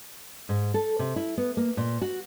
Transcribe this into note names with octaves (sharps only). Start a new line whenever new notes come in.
G#2
A4
C3
E4
B3
A#3
A#2
F#4